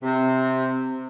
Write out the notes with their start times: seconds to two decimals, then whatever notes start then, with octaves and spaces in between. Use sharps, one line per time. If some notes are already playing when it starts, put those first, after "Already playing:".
0.03 C3